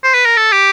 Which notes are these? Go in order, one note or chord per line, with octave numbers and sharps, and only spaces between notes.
C5
B4
A#4
A4
G4